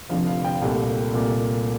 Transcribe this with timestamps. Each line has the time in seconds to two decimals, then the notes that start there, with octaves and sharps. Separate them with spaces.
0.09 F1 F2 D3 F3 F5
0.27 F5
0.44 G5
0.62 C2 A#2 A3
1.14 C2 A#2 A3